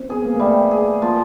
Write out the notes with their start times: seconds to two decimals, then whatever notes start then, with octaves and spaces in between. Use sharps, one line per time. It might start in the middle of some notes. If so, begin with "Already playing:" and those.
Already playing: C4
0.09 B3 G#4
0.25 A#3
0.35 A#3
0.40 G3 A3
0.71 G#4
1.02 F3 A#3